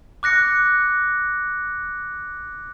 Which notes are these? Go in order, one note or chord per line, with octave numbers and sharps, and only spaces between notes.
D6 F#6 A#6 C#7